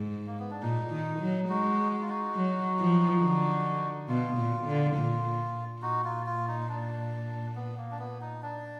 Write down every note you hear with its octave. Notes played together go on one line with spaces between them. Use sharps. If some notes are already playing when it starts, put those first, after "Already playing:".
Already playing: G#2
A#3
B3
D4
A#2 D#4
D#3
F#3
G#3 D#4 F#4
F#4
F4
D#4 F#4
F#3
F3
D3
B2 F4
A#2
D3
A#2
A#2 D#4 F#4
F4
F4
D#4
D4
B3
A#3
D4
B3
D#4
D4